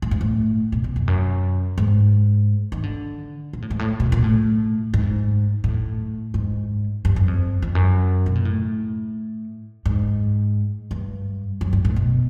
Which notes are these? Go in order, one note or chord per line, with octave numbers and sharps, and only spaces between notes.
A2
G#2
A2
B2
B2
F2
F#2
G#2
D#3
D3
A#2
A2
G#2
A2
B2
A#2
A2
G#2
A2
G#2
G2
F#2
F2
F2
F#2
B2
A#2
A2
G#2
G2
F#2
G2
A2
B2